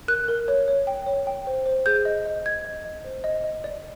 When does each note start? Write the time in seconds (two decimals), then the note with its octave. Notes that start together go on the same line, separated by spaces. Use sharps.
0.08 A#4 F#6
0.28 A#4
0.48 C#5
0.68 C#5
0.87 G5
1.06 C#5
1.27 G5
1.47 C5
1.66 C5
1.86 G#4 G6
2.05 D#5
2.26 D#5
2.45 D#5 G#6
2.65 D#5
2.84 D#5
3.04 C5
3.24 D#5
3.44 D#5
3.64 D5